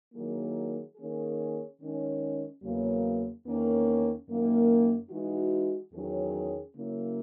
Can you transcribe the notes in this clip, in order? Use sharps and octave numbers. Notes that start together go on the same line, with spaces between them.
D#3 F#3 A#3 E4 G#4
D#3 A#3 C#4 G#4
D#3 G#3 C#4
E2 C#3 F#3 A#3
E2 D#3 A#3 C#4
F#2 D#3 A#3
E3 G#3 D#4 F#4
E2 D#3 F#3 C#4 G#4
C#3 F#3 A#3 C#4 E4